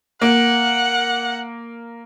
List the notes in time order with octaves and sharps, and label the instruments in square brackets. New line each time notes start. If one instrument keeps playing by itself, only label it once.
[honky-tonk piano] A#3 [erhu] F#5